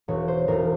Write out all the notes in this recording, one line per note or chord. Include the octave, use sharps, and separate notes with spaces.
E1 C#5
C5
E1 A#4